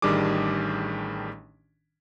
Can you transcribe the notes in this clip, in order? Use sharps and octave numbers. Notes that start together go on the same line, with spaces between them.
A1 D#3 G3 D4 G#4 D6